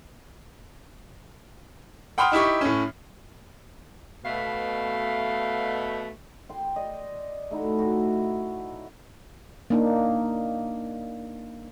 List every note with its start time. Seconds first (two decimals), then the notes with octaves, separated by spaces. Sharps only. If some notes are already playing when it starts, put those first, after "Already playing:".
2.18 F#5 G5 B5 C6 D#6 F6
2.32 D#4 E4 G4 C#6
2.61 A2 C#4
4.25 B2 A3 F5
6.49 G5 C6
6.76 D5 D#5
7.51 A3 D#4 E4 F#4
7.79 A2 F#4
9.70 A#3 D4 D#4